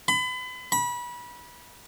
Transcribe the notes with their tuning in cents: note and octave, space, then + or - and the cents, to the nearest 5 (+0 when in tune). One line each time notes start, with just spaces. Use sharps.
B5 +35
B5 -25